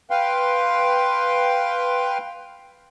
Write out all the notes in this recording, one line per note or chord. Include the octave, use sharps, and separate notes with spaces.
B4 F5 G5 C6